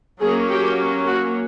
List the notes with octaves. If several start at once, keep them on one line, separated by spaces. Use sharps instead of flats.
F#3 A#3 C#4 G#4
G4
F#4